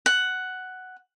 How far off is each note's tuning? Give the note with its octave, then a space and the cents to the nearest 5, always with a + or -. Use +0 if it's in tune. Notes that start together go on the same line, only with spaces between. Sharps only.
F#5 +5